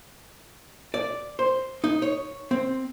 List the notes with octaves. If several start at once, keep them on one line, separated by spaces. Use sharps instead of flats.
D5
C5
D#4
C#5
C4